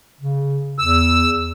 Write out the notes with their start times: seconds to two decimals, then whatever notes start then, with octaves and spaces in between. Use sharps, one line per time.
0.21 C#3
0.79 E2 E6